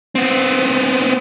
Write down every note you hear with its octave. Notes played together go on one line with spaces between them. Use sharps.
B3 C4